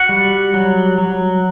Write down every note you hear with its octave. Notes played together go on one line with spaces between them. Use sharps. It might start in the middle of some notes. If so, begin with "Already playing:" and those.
Already playing: F#4 F#5
G3
F#3
F#3